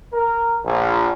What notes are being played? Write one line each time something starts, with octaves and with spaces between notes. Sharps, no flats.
A#4
A#1